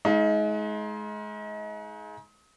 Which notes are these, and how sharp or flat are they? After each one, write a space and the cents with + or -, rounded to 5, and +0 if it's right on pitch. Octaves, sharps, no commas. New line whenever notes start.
G#3 +30 D#4 +35 F5 +0